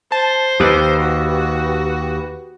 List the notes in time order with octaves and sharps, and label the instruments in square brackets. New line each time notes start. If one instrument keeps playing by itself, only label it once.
[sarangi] C5 [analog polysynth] A5
[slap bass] D#2 [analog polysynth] G4 B4
[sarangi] F#4